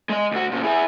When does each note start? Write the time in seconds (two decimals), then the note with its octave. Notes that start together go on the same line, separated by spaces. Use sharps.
0.09 G#3 D#5
0.31 D2 F#4
0.52 A#2 C#3
0.63 E4 G#4